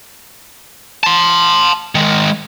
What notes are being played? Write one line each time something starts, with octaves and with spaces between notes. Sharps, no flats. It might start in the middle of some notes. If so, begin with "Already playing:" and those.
A5 C6
D#3 G#3